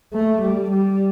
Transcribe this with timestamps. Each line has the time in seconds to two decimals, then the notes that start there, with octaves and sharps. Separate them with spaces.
0.13 A3
0.42 G3
0.72 G3